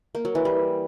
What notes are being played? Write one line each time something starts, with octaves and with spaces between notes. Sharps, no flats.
A#3
F#3
E3
G3